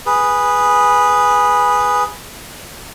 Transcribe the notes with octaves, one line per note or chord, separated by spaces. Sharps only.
G#4 B4